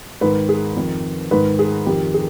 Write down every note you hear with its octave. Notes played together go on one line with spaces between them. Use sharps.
G#2 D#3 B4
G#4
F2 D#3
G#2 D#3 B4
G#4
F2 D#3 G4
G#4